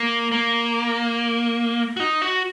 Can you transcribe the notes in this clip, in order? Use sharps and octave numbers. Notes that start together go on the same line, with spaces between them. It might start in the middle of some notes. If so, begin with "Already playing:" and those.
Already playing: A#3
A#3
F#4
D#4
F#4